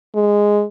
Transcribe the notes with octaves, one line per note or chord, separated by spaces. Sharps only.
G#3